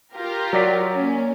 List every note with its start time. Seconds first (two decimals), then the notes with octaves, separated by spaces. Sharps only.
0.15 F4 G4 A#4
0.53 F#3 D5 B6
0.94 A#3 C#4